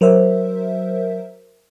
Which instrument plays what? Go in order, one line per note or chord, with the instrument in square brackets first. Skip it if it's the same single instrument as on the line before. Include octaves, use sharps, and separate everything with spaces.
[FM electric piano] F#3 A#4 C5 E5